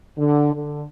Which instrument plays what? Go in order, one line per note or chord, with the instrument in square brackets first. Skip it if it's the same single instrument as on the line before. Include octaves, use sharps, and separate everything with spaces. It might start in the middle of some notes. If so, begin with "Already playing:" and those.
[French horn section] D3
D3